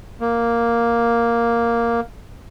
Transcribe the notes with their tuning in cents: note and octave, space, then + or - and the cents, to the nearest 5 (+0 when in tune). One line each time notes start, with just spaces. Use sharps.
A#3 +0